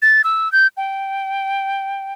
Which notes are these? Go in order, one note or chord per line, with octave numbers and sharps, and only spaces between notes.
A6
E6
G6
G5